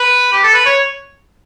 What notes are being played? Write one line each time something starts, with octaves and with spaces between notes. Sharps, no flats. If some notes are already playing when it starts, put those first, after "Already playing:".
Already playing: B4
G4
A4
B4
C#5